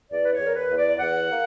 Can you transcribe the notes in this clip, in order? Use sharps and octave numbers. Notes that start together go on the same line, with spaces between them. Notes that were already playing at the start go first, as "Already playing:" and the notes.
E2 D5
B4
C#5
E2
A#4
B4
E2
D5
E2 F#5
A#3